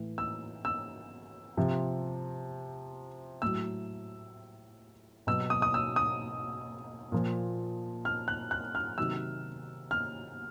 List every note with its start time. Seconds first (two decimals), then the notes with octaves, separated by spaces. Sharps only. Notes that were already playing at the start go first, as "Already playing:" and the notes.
Already playing: A2 E3
0.18 E6
0.65 E6
1.57 C3 F3
3.42 A2 F#3 E6
5.27 B2 F#3 E6
5.50 D#6
5.62 D#6
5.74 E6
5.96 D#6
7.12 A#2 F3
8.05 F6
8.28 F#6
8.51 F#6
8.75 F6
8.97 C3 D#3 F#3 E6
9.91 F6